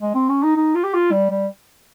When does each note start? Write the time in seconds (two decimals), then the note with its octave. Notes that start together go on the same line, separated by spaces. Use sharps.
0.01 G#3
0.15 C4
0.29 C#4
0.43 D#4
0.56 D#4
0.75 F4
0.84 G4
0.94 F4
1.12 G3
1.30 G3